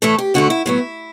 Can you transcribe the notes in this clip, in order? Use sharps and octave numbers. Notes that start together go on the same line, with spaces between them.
A2 E3 A3 A4
G4
D2 D3 A3 F#4
E4
A2 F#3 B3 E4